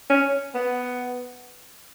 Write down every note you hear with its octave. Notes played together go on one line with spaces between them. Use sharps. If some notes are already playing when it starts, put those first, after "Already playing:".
C#4
B3